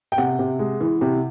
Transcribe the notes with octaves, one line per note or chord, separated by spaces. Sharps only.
G5
C3 F#5
C3
G#3
E3
C3